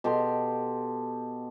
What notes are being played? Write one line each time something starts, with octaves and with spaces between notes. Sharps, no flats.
B2 G4 A4 C6